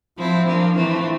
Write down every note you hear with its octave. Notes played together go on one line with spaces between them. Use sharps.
F3 C4 E4
F3 A#3 D4
E3 A3 C4